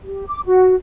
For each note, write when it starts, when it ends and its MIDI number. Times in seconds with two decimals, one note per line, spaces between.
0.04 0.24 67
0.28 0.40 86
0.46 0.75 66